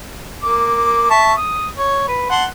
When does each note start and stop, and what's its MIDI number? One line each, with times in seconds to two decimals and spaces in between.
0.43 1.08 58
0.43 1.08 86
1.10 1.33 76
1.10 1.33 81
1.10 1.33 85
1.37 1.68 87
1.77 2.08 73
2.08 2.28 71
2.30 2.45 78
2.30 2.45 81
2.30 2.45 84